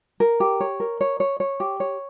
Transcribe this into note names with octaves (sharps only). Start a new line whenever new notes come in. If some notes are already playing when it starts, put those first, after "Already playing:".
A#4
G4
C#5
A#4
C#5
C#5
C#5
G4
C#5